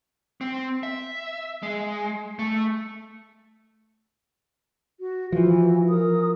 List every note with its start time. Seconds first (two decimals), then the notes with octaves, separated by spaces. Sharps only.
0.41 C4
0.83 E5
1.63 G#3
2.39 A3
5.00 F#4
5.32 E3 F3 F#4
5.89 A#4 D#6